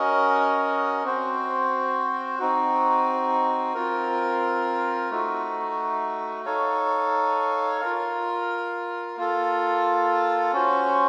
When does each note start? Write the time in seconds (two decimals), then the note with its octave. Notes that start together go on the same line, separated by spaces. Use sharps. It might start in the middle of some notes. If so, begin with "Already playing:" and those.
Already playing: C#4 F#4 A#4 D#5
1.04 C4 F#4 C5
2.39 C4 D#4 F#4
3.74 C4 F4 A#4
5.10 A3 D#4 F#4
6.45 D#4 A4 C#5 F5
7.81 F4 A#4 F5
9.17 A#3 F4 A4
10.53 C#4 F#4 C5